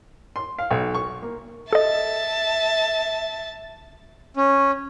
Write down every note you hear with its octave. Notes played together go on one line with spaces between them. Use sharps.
C6
F5
B1
C#6
A#3
A4 D#5 E5 A5
C#4